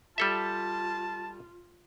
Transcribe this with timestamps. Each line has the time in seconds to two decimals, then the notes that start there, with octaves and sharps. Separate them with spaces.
0.18 G3 F4 A4 E5 A5